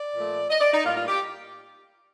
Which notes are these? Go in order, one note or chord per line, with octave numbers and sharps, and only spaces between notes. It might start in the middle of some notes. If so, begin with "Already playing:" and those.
Already playing: D5
A#2 F3 A3
D#5
D5
D#4
A2 G3 A#3 F4
F4
G4